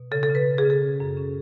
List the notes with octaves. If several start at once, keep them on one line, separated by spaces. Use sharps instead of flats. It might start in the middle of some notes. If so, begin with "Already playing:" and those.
Already playing: B2
C#3 A4
A4
C#3
B4
C#3
G#4
C#3
A4
C#4
F#2
C#4